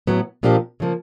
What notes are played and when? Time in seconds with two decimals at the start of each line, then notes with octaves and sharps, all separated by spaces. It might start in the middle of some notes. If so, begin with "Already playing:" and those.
0.07 A2 F#3 B3
0.43 A#2 F3 A#3 D4 G4
0.80 C#3 F3 A#3